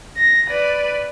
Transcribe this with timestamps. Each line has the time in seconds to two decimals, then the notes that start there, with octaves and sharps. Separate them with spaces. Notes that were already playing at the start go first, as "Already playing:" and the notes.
0.18 A#6
0.49 B4 D5